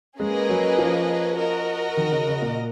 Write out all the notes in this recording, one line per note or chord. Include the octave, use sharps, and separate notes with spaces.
G#3 A#3 C#4 G#4 B4 D#5
F#3
F3
F#4 A#4 D#5
D#3
C#3
C#3
A#2